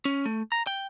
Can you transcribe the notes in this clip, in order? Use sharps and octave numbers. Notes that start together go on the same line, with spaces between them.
C#4
A3
A#5
G5